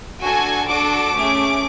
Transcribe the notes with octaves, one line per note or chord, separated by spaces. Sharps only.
D4 F#4 A4 G#5
D4 F#4 A4 D6
A3 C#4 G#4